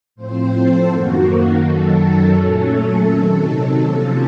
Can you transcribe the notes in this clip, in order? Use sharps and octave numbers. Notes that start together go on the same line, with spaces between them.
A2 F3 C4 C5
A4
F#2 D#3 A#3 F#4
F#4
F#2 D#3 F#3 A4
A#2 F#3 A3 C#4 A4
A4
C3 D#3 F#3
C3 F3 A#3 C#4